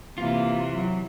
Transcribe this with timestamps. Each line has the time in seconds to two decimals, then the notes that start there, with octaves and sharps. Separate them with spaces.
0.18 C3 E3 A#3 F4
0.69 F#3